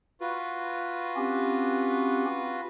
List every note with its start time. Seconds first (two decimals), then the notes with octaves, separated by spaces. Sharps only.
0.21 F4 F#4 B4
1.16 C4 C#4 G4